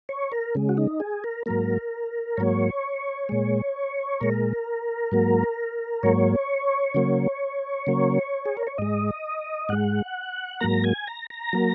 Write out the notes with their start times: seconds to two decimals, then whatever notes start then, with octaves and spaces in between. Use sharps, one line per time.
0.09 C#5
0.32 A#4
0.55 C#3 G#3
0.69 F#4
0.77 D#4
1.00 G#4
1.24 A#4
1.46 G#2 F#3 A#3 A#4
2.37 G#2 F#3 A#3 C#5
3.29 A#2 G#3
4.20 A#2 G#3 A#4
5.12 G#2 F#3 A#3
6.03 G#2 F#3 A#3 C#5
6.95 C#3 F#3 A#3
7.87 C#3 F#3 A#3
8.46 G#4
8.57 A#4
8.67 C#5
8.78 G#2 G#3 D#5
9.69 G#2 G#3 F#5
10.60 G#2 F#3 A#3 A#5
10.84 G#5
11.07 A#5
11.30 A#5
11.53 F#3 A#3